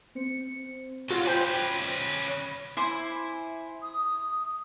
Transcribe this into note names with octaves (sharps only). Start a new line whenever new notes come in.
C4 C5 C#7
F#3 F4
C#4 B4 C5 G5
E4 C5 G#5 D6
D#6